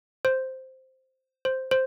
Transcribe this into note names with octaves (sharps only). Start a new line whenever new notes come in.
C5
C5
C5